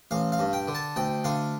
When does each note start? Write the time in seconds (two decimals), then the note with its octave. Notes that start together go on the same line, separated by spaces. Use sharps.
0.11 A1 F5
0.32 F5
0.39 G2
0.53 G5
0.68 D3
0.75 A5
0.96 D2 G5
1.24 D3 F5